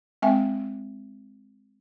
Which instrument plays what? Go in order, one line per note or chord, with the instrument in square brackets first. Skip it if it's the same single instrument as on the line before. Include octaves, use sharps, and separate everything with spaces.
[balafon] G#3 C4 E5 G5 G#5